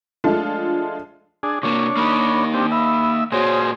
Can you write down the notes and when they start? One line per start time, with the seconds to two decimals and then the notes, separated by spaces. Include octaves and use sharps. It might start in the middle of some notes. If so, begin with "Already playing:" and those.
0.24 F3 G#3 A3 D4 F4 A4
1.43 D4 G#4
1.63 C3 A#3 D4 C#5
1.97 A#3 D#4 B5
2.54 C4 D4 G4
2.72 E5 B5
3.32 A#2 F#4 G#4 C5 C#5